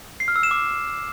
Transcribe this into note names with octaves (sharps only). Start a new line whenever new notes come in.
C7
F6
E6
E7
D6